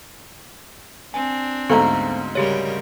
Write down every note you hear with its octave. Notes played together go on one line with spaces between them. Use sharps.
C4 D4 G#5
D2 G#2 B3 A4 C5 F5 A#5
C#3 G3 G4 A#4 C#5